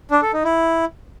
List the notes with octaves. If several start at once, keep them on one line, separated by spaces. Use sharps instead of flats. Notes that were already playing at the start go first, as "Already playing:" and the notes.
D4
A4
D#4
E4